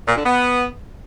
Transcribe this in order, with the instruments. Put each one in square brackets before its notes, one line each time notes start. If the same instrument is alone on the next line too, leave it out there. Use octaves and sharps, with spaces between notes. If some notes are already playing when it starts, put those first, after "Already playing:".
[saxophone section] A#2
D3
B3